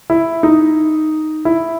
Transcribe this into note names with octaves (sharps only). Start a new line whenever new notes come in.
E4
D#4
E4